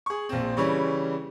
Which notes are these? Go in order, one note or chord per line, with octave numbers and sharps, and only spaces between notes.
G#4 C#6
A#1 C4
C#3 E3 G3 C#4